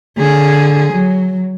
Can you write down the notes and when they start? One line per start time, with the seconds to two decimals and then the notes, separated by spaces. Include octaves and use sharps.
0.18 D3 G#4
0.92 F#3